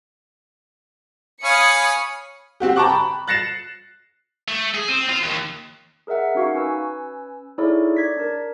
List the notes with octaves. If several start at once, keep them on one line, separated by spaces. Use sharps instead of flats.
C#5 F5 G#5 B5 D#6 C#7
C4 F#4 G4
G5 A5 A#5 C#6 D6 F#6
B5
F#6 A6 A#6 C7 C#7 E7
A3
G#4
C4
F4
D#2
G#4 A#4 D#5 E5 F#5
C#4 D#4 F#4 F5 C#6
C#4 B4 G#5 E6
D#4 E4 G#4 A4 C#5 D5
D5 G#6 B6
D4 A#4